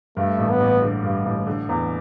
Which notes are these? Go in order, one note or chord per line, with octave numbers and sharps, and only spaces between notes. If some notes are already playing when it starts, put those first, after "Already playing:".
G2 A3
A1
B3
A1
D3
G2
A1
D3
E2